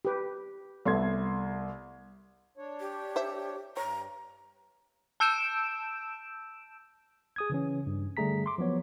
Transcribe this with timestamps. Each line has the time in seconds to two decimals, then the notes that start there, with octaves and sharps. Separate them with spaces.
0.05 G4 B4
0.86 C2 A3 B3 C6 G#6
2.57 D4 C#5
2.80 G4
3.16 C5 E5
3.77 G2 C#5 A#5
5.20 A5 E6 G6 D7 E7
7.36 G#4 D#6 G#6
7.50 C#3 E3 C#4
7.87 G2
8.17 D3 G3 A3 G#4 A#5 B6
8.46 C6 D6
8.58 F3 F#3 B3 C#5